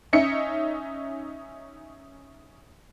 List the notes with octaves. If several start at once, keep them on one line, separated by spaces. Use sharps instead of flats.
C#4 D#4 E5 C#7